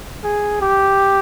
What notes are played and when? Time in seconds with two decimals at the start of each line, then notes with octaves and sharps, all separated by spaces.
0.24 G#4
0.61 G4